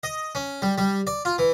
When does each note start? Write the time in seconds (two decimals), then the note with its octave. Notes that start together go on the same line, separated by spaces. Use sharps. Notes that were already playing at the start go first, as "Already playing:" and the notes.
0.03 D#5
0.35 C#4
0.62 G3
0.78 G3
1.07 D5
1.25 F4
1.38 E3